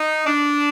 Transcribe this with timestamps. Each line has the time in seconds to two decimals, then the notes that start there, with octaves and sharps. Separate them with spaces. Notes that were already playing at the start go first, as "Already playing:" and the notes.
Already playing: D#4
0.26 D4